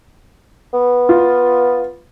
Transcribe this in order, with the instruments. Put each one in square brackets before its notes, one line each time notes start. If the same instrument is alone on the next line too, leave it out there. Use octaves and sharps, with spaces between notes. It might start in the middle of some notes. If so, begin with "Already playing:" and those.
[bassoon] B3
[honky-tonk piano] F4